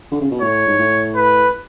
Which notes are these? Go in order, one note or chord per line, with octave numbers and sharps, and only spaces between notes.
D3
C#3
B2
A2 C#5
G#2
A2
B4